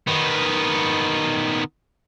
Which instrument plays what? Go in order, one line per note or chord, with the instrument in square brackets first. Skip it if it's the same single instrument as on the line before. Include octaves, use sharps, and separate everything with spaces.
[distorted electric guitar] D#3 B3